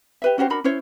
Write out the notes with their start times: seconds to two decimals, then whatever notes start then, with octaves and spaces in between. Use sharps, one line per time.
0.22 G4 B4 E5
0.38 C#4 F#4 G4 C5
0.50 D4 F#4 A#4 B5
0.64 C#4 E4 C5 C#5